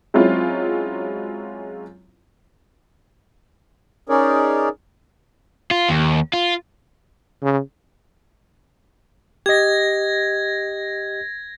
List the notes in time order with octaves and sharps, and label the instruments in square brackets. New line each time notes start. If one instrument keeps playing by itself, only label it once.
[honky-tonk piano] F#3 G#3 C4 C#4 E4 F4
[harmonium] C#4 D#4 G#4 A#4 C#5 D5
[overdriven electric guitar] F4
D#2
F4
[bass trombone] C#3
[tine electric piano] G4 D#5 [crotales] G#6 A#6